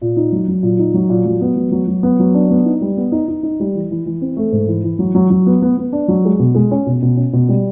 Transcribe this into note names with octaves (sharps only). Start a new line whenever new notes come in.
A#2
D#4
F#3
F#3
A#2
D#4
F#3
A#2
F#3
B3
F#3
F#3
F#3
B3
F#3
D4
B3
D#4
G3
B3
D#4
D#4
D#4
G3
E3
E3
E3
C4
A3
G#2
E3
E3
F#3
F#3
F#3
B3
B3
B3
D4
F#3
G#3
B2
G#3
C#4
B2
B2
C#4
B2
G3